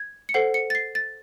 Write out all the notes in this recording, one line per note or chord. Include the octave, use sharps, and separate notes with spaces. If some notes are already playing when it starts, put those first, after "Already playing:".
Already playing: G#6
C#7
A4 C5 F#5 C7
C#7
A6
C7
A6